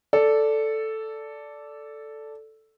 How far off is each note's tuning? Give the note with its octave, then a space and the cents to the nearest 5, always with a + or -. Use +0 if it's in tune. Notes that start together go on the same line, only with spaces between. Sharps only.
A4 +0 D5 -10